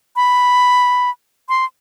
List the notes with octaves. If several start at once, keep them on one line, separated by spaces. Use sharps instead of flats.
B5
C6